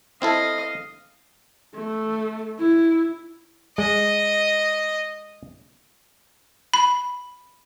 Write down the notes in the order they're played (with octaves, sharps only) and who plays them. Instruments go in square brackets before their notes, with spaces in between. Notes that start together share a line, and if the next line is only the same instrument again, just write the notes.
[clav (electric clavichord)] C4 E4 A4 [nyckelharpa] D#5 F5
[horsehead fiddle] A3
E4
[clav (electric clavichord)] G#3 [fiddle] D#5
[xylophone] B5